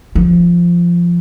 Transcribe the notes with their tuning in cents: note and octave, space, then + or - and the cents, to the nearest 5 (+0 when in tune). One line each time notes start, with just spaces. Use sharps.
F3 -10